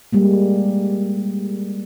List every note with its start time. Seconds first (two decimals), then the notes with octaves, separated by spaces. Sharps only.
0.13 G3 G#3 A#3